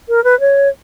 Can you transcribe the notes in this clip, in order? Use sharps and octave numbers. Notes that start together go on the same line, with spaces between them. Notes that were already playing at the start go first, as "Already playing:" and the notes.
A#4
B4
C#5